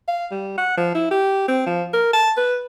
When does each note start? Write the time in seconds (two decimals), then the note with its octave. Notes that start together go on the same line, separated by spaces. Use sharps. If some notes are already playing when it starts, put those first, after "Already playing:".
0.08 F5
0.31 G3
0.58 F#5
0.77 F3
0.95 E4
1.11 G4
1.48 C4
1.67 F3
1.93 A#4
2.13 A5
2.37 B4